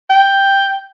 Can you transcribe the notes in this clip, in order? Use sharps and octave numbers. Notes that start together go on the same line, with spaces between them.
G5